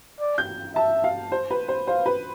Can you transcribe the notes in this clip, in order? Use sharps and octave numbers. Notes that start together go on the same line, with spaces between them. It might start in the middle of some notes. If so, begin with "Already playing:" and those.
D5
G6
E5 A5
F5
C5
B4
C5
C5 F5
B4